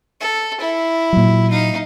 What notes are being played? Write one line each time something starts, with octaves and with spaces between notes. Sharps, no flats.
A4
E4
A#2 F#3
D#4 F5